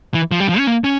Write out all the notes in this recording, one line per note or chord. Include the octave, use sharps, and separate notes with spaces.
E3
F3
G3
F3
C#4
A#3
C#4